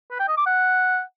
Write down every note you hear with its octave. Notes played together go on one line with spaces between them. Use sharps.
B4
G5
D#5
D6
F#5